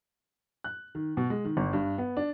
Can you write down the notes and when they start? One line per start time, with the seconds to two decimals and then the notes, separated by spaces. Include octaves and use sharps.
0.64 F#6
0.95 D#3
1.17 B2
1.30 G#3
1.45 D#3
1.57 G1
1.73 G2
1.98 B3
2.17 D4